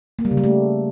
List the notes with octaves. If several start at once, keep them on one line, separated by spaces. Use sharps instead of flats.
A#3
G3
C#3
G3
A3